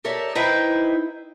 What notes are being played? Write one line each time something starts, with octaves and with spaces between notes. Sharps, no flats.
G4 A4 A#4 C#5 D5 E5
D#4 E4 B4 C5 E5 G5